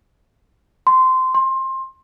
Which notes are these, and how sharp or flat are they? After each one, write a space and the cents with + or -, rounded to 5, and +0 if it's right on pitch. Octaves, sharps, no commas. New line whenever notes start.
C6 -15
C6 +20